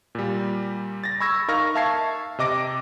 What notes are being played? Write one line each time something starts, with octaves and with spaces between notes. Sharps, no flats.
A#2 G3
A6 A#6
B5 C#6 E6 G#6 A#6
D#4 A#4 F5 C#6 F6 A#6
E5 F5 A5 C#6 G#6 C7
C3 D#5 D6 A#6 D7